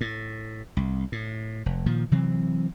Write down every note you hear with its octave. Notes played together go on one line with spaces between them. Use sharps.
A2
C2
A2
F1
A#2 D#3 F3
C3 E3 F#3 C4